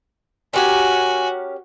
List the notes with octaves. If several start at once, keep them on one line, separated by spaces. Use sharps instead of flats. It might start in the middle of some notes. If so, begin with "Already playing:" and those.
C#4 F#4 G4 A#4 G#5